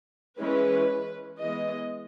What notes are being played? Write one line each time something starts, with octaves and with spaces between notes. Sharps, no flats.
E3 G#3 C#4 B4
E3 G#3 B3 D#5